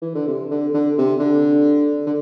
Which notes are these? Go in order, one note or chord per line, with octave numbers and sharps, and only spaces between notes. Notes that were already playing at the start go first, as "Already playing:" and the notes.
E3
D3
C3
D3
D3
C3
D3
D3